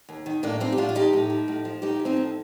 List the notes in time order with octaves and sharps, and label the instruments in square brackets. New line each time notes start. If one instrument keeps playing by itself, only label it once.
[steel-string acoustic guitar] D#2
D#3
A2 A#3 D4
F3 C4 D#4
G4
A2 D4 F4
F4
F3 D#4 G4
A2 D#4 G4
F3
A2
F3
A2 D#4 G4
F3
C4 D#4
A2